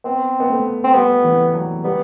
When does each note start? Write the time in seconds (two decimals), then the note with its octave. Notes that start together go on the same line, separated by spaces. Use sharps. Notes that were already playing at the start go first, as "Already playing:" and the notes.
0.04 B3 C4
0.40 B3
0.50 A3
0.84 C4
0.94 G3 B3
1.24 E3
1.54 F#3
1.84 G3 B3